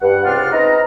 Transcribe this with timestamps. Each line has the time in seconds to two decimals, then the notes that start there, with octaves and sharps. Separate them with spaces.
0.02 G2 F#5
0.25 C#2 C3 C4 D4 F4 F6
0.53 C4 D#4 B4 A#5